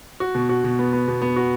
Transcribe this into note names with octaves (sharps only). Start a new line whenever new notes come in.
F#4
B2
F#4
B2
B3
B3
B2
B3
F#4